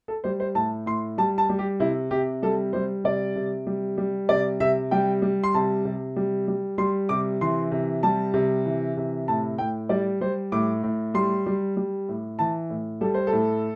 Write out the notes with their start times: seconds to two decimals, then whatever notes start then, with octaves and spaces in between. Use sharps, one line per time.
0.08 A4
0.24 G3 C5
0.40 C5
0.55 A2 A5
0.86 A2 C6
1.18 G3 A5
1.38 A5
1.49 G3
1.59 G4
1.80 C3 E4
2.11 C3 G4
2.42 G3 A4
2.73 G3 C5
3.04 C3 D5
3.36 C3
3.67 G3
3.98 G3
4.29 C3 D5
4.60 C3 E5
4.91 G3 G5
5.22 G3
5.44 C6
5.54 C3 A5
5.85 C3
6.16 G3
6.48 G3
6.78 G3 C6
7.09 C3 D6
7.41 E3 C6
7.72 C3
8.03 G3 A5
8.34 C3
8.66 E3
8.97 C3
9.28 A2 A5
9.58 A2 G5
9.89 G3 D5
10.21 G3 C5
10.52 A2 D6
10.83 A2
11.14 G3 C6
11.46 G3
11.77 G3
12.09 A2
12.39 E3 A5
12.70 A2
13.01 G3 A4
13.14 C5
13.27 A4
13.32 A2